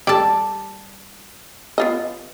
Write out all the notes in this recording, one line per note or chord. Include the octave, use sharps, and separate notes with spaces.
G3 A4 D5 A5
B3 F4 D#5